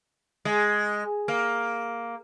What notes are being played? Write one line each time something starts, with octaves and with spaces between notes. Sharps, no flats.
G#3
A#3